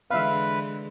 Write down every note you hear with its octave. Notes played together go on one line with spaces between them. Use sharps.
D3 E3 G#3 B4 E5 F5